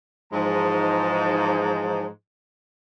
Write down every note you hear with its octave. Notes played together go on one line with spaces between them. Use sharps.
G#2 E3 F3 G#3 D#4 A5